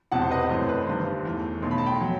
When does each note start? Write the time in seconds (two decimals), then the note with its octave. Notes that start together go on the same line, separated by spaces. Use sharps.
0.12 E1 E2 C3 F#5 A5
0.22 C5
0.31 B4 D#5
0.49 F#2 E3 A3 C5
0.69 B4
0.87 G1 G2 D#3 G3 C5
1.25 E2 D#3 A3
1.62 B1 B2 A3 C6
1.71 B5
1.78 A5
1.86 G5 B5
2.01 F#3